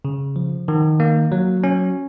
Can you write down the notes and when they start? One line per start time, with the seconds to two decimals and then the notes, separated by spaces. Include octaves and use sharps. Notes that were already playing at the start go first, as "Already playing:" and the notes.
0.05 C#3
0.36 F3
0.68 D#3
1.00 A#3
1.32 F#3
1.63 C#4